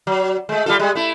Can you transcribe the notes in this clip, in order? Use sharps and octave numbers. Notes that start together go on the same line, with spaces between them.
F#3
G#3 A3
G3 F4 A4
G3 G#3
A3 E4